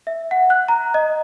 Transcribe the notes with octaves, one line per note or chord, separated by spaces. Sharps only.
E5
F#5
F#6
A#5
D#5